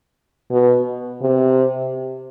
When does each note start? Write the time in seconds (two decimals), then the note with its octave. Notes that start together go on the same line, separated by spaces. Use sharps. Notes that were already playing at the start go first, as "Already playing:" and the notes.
0.51 B2
1.22 C3